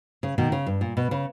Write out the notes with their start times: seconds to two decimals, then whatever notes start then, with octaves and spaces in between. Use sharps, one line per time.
0.23 C#3
0.38 B2 D#3
0.52 C#3
0.66 G2
0.81 A#2
0.97 B2
1.11 C#3